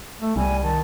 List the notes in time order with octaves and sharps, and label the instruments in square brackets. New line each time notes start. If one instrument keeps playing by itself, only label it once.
[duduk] A3
[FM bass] C2 [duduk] G3 [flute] G#5
[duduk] D#3 [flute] A5